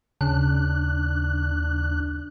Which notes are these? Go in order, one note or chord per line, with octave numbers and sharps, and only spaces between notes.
D#2 C#3 D4 F#6